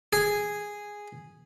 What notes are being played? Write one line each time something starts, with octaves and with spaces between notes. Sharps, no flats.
G#4